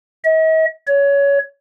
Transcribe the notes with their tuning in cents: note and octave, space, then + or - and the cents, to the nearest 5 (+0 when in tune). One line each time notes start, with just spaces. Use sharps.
D#5 +45
C#5 +20